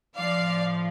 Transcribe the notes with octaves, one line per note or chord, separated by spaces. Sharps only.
A2 F3 D5 F5